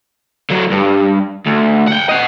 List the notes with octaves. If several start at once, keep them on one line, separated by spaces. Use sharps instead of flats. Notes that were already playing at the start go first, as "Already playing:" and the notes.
D3 F#3
G2
D2
F#5 G5
D#5 F#5